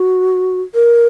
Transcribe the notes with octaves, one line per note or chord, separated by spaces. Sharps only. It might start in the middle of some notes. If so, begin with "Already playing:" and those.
Already playing: F#4
A#4